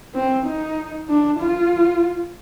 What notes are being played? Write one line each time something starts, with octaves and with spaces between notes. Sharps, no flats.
C4
D#4
D4
F4